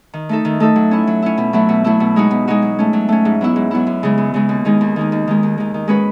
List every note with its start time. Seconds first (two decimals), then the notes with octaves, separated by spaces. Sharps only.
0.14 D#3
0.29 A3 D#4 A4
0.45 D#3
0.60 A3 D#4 A4
0.76 F#3
0.91 C#4 E4
1.07 F#3
1.22 C#4 E4
1.38 B2
1.53 F#3 A3 E4
1.69 B2
1.84 F#3 A3 E4
2.00 B2
2.16 G#3 D#4 F#4
2.31 B2
2.47 G#3 D#4 F#4
2.62 F#3
2.79 A3 C#4
2.93 F#3
3.09 A3 C#4
3.25 G#2
3.41 F#3 B3 E4
3.56 G#2
3.71 F#3 B3 E4
3.87 F#2
4.03 C#3 G#3
4.18 F#2
4.34 C#3 G#3
4.49 D#2
4.65 D#3 G#3 D#4
4.81 D#2
4.96 D#3 G#3 D#4
5.12 D#2
5.27 D#3 G#3
5.43 D#2
5.58 D#3 G#3
5.74 D#3
5.88 G#3 C#4 F#4 B4